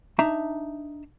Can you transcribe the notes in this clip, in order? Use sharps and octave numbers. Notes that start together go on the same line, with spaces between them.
D4 D#4 E5 A#5